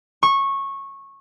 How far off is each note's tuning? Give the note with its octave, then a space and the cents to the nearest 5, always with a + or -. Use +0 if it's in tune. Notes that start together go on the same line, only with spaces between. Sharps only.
C#6 -15